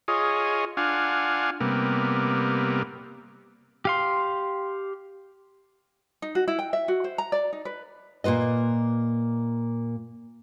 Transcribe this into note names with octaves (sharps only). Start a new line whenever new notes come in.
F4 G#4 C#5 D#5
D4 F4 F5 F#5 G#5
C3 G3 A#3 B3
G4 F5 C6
D#4
F#4
E4
G5
E5
F#4
C5
A#5
D5
D#4
B4
A#2 A#3 F4 B4 D#5